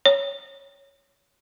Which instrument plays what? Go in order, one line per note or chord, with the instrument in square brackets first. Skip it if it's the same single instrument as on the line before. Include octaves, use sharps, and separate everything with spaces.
[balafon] C#5